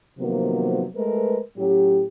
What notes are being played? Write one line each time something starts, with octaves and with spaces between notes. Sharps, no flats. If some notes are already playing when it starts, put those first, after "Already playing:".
C3 D#3 F3 F#3 A#3 B3
G#3 A3 A#4 B4
A2 F#3 C#4 G4